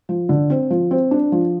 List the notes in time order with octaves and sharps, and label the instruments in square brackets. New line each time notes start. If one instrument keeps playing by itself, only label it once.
[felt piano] F3
D3
C4
F3
C4
D4
F3